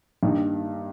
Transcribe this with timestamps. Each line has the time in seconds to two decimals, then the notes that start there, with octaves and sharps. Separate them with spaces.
0.23 G2 D#3 A#3 D#4 G4